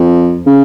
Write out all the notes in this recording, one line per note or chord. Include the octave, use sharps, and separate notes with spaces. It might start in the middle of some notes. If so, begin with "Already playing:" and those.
Already playing: F2
C#3